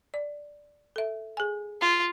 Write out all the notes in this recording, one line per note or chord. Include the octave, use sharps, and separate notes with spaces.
D5
A4 E5
G#4 G#5
F4